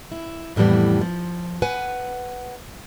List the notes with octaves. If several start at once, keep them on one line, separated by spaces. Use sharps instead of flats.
E4
F2 A2 E3 G3 B3
F3
B4 F#5 G#5